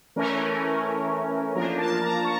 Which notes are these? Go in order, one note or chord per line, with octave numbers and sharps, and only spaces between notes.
E3 A3 C#4 A#4
F3 A#3 D4 F4 A#4
A5
A#5
C#6